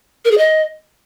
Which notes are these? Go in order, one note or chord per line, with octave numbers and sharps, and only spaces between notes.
A#4
G#4
D#5